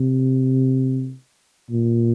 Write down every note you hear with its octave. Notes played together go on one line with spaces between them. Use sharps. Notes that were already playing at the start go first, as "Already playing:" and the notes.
Already playing: C3
A#2